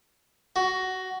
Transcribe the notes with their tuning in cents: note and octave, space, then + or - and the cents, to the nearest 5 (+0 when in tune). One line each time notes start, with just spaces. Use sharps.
F#4 +15